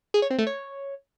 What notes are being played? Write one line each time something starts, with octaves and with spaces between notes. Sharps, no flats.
G#4
C#5
C4
A3
C#5